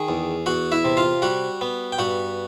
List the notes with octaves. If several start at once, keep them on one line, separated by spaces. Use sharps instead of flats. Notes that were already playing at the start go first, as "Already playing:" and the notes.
Already playing: D#3 G#4 G#5
E2
E2 F#4 F#5
E4 E5
C3
F4 F5
G3 F#4 F#5
B3
G5
G2 F#4 F#5